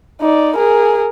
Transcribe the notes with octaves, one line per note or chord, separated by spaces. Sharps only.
D#4 D5
G#4 A#4